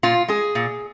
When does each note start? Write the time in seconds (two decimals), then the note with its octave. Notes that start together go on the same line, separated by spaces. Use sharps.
0.03 A#2 F4
0.28 G#3 G#4
0.55 A#2